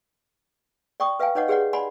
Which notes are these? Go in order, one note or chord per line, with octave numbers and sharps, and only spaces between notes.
D5 G5 C#6 D#6
B4 E5 F5 G5 G#5
D#4 B4 C#5 D#5 F#5 D6
G4 G#4 B4 C#5 D5 F#5
D5 F#5 G#5 B5 C6